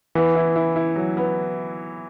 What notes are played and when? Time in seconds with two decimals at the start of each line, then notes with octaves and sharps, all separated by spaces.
0.15 E3 B3
0.35 E4
0.56 E4
0.76 E4
0.96 F#3
1.17 B3